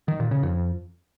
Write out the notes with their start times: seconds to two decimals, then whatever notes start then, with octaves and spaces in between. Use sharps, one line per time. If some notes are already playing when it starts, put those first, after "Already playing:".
0.08 D#3
0.20 A#2
0.31 C#3
0.43 F2